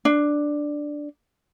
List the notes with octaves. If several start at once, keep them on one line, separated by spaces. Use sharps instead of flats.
D4